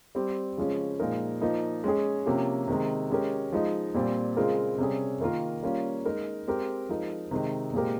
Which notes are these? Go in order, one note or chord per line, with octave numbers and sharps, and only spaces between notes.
G3 C4 G4
C#3 F3 G#3 C#4
A#2 F3 G#3 D#4 A#4
F3 A#3 D#4
G#3 C#4 G#4
C3 F3 A#3 C#4 G4
C3 D#3 G#3
G#3 C#4 G4 A#4
F3 G#3 D#4
A#2 G3 C4
C#3 G#3 C4 F4 A#4
C3 G3 C#4 G#4
D#3 A#3 F4 A#4
G3 A#3 C#4 F4
G#3 D#4 A#4
G#3 C4 G4 A#4
F3 G#3 D#4 A#4
C3 D#3 G#3 D#4
A#2 G#3 C4 G4 A#4